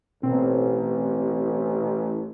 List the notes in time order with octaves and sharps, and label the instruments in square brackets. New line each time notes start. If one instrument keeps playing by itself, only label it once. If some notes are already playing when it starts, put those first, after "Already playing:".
[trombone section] A1 [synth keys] B2 C4